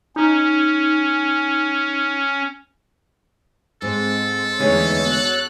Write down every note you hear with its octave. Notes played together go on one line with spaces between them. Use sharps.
C#4 D#4
G#2 G#3 C4 A4
E2 D3 G#3 A3 D#4 B4 C#5 D#6
F#4 C#5 F#6